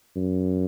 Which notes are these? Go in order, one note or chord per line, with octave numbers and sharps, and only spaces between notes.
F#2